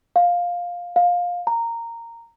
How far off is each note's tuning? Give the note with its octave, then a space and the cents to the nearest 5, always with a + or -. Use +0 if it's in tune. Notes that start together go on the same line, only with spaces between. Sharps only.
F5 +10
F5 +20
A#5 -10